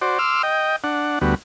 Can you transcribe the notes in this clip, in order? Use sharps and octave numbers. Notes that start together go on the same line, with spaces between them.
F#4 C5 D5
C6 D6 E6 F6
D#5 G5
D4 F#5
D2 G3 B3 F#4